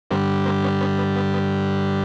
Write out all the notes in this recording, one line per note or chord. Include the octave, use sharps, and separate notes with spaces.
G2 D3 G3 A#3 C4
A#3 C4
B3 C#4
B3 C#4
B3
B3
B3